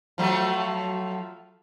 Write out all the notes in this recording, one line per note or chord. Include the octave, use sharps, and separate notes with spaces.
F3 F#3 A3